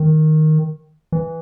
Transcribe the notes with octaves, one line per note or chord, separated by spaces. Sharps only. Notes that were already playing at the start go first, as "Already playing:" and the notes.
Already playing: D#3
E3